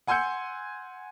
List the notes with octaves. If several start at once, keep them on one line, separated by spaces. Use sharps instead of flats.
F#5 G#5 C6 E6 G6 C#7